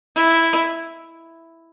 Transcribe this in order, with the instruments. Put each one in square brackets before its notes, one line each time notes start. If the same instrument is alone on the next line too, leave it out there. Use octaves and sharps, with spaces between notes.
[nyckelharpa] E4